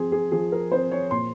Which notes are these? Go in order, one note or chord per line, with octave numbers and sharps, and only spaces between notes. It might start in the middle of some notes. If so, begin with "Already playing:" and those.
Already playing: F3 C4 G#4
G#4
F3 G#4
A#4
C4 C5
C#5
A#2 C6